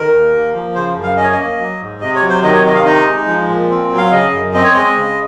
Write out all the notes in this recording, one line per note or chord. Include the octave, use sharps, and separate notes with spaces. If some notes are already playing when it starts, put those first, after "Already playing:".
Already playing: D#3 A#4
D#2
A#3
F3
C#3 C5
F#2
F5
C#4 D#5
C#5
D#5
A#3
F#3
G#2
C3 D#5
C#5
F#3
C5
D#3 D#5
C#5
C3 D#5
F5
D#4 D#5
G#3
F3
A#2
C4
F#3
F5
C#3 D#5
F#2
C4 D#5
C#5
G#3 D#5
C#3